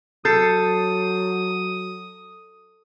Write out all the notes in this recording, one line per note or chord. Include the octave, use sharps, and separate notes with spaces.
F#3 A4 D#6 G6 A6 C7